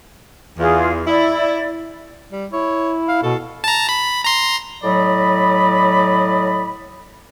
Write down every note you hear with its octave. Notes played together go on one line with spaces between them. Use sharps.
E2 F4 G#4
E4 D5
G3
E4 C#5
F5
B2 A4
A5 A#5
B5
A#5 C6
A2 F#3 D5 D#5 B5